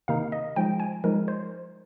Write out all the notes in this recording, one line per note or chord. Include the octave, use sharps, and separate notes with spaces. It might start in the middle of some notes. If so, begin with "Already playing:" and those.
C3 D#3 A#3 D#4 F5
D#5
F3 G#3 D#4 G5
G#5
F3 G#3 D#4 A#4
C5